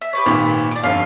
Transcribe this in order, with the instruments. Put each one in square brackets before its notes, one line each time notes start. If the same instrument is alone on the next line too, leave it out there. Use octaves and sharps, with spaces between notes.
[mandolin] E5
G4 B4 C#5
[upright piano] G#1 A#2 D#3
[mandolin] D4 D6
[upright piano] G1 F2 [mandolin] C#4 [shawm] F5